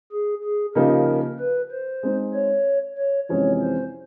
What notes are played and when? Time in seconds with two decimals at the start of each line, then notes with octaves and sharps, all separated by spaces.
0.12 G#4
0.44 G#4
0.75 C#3 F3 A#3 D#4 G4 A#4
1.39 B4
1.71 C5
2.03 G#3 C4 D#4
2.34 C#5
2.98 C#5
3.29 F2 C3 E3 G#3 C#4 C#5
3.62 C5